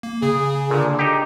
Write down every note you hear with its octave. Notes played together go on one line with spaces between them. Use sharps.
A#3
C#3 G#4
A#2 D3
D#4 G4